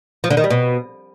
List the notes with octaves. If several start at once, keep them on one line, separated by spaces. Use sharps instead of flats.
F3
D3
D#3
G3
B2